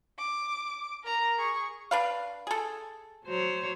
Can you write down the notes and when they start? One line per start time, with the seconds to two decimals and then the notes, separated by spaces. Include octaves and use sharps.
0.18 D6
1.04 A#4 A#5
1.37 G#4 C#6
1.91 D4 B4 F5
2.47 G#4 A4
3.25 F#3 C5 C#5